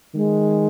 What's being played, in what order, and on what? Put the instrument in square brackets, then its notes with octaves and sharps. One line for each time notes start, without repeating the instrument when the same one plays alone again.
[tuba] D#3 [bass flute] G#3